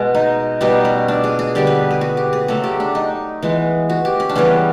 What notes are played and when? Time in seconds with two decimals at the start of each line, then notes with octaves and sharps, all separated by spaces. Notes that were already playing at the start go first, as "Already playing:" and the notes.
Already playing: B2 G#3 B3
0.15 D#4
0.61 B2 G3 B3 D#4
0.85 C#4
1.08 D4
1.24 G#4
1.39 G#4
1.55 D3 G3 B3 G4
1.67 B4
1.91 G#4
2.01 F#4
2.17 G4
2.33 G#4
2.48 C#3 F#3 A3 A4
2.64 G4
2.80 D4
2.95 D#4
3.43 E3 G#3 B3
3.90 F#4
4.05 G4
4.20 C#4
4.29 D4
4.36 C#3 E3 G3 B3 C#4